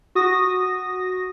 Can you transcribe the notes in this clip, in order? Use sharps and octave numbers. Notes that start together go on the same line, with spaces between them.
F#4 D#6 A#6